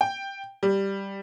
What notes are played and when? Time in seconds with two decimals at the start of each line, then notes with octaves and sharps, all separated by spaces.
0.01 G5
0.63 G3